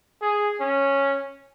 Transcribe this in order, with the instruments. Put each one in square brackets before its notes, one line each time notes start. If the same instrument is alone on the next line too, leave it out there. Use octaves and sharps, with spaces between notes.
[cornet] G#4
C#4